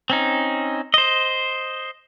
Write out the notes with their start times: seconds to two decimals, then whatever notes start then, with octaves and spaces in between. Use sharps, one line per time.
0.10 C4 C#4 D#4
0.94 C5 D#5